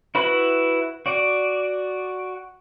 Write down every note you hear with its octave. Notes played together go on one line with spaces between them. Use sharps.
E4 F#4 B4 B5
F#4 D5